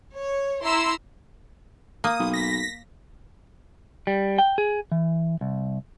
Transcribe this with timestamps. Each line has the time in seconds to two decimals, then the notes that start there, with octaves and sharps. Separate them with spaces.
0.15 C#5
0.64 E4 A#5 C6 E6
2.04 A#3 D#6
2.19 B1
2.34 A#6 B6
4.07 G3
4.38 G5
4.58 G#4
4.92 E3
5.41 C2